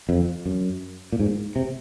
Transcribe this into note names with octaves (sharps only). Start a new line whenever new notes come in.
F2
F#2
A#2
G#2
C3